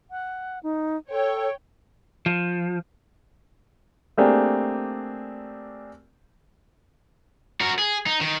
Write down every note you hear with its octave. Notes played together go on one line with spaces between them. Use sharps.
F#5
D#4
A4 C#5 G5
F3
A3 A#3 C4 D4 G4 G#4
F#4 A#4
G#4
D#4
D#3